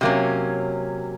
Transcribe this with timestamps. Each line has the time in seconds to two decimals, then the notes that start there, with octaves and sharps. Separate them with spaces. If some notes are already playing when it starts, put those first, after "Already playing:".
0.01 C3 F#3 A#3 C#4